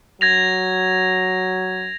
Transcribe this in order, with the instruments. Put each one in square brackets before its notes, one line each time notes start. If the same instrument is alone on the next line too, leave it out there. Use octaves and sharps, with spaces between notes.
[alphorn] F#3 [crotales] G#6 A#6 F7